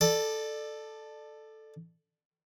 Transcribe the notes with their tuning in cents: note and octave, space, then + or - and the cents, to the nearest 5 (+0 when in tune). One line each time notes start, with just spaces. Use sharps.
A4 +0 D5 +25